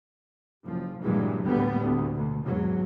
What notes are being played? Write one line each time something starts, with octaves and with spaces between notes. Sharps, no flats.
F#1 F3
G2 A#2 D3 E3 F#3 G#3
D2 A2 G3 A#3 B3
D2 D3
D2 B2
G#1 E2 F#3